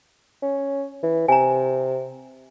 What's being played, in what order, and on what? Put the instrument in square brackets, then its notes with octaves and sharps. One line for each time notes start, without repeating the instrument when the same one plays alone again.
[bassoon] C#4
E3
[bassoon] C3 [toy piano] G#5 A#5